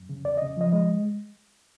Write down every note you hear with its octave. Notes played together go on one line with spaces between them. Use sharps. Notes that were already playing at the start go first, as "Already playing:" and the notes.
Already playing: F#2
C#3
E2 D5
D#5
C#3
F3 D#5
G#3 D#5